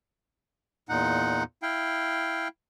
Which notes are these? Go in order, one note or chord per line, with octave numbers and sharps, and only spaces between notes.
E2 A#2 D#4 F#5
E4 F5 G5